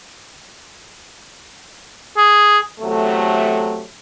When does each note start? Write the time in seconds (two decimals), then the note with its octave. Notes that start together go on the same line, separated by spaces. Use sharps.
2.17 G#4
2.80 E2 C3 F#3 A3